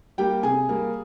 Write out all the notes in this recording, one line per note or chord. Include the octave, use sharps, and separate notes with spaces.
G3 A#3 G4 G5
C3 G#4 G#5
G3 A#3